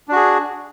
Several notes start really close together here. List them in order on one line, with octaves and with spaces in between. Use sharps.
D4 F#4 G#4